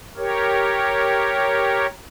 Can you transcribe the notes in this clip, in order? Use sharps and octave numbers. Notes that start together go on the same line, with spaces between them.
G4 A#4 C#5